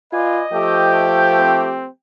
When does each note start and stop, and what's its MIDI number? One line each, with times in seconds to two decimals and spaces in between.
0.13 0.42 65
0.13 0.43 71
0.13 0.43 74
0.13 1.09 75
0.13 0.43 80
0.52 1.88 53
0.52 1.85 57
0.52 1.85 67
0.52 1.93 79
1.38 1.89 60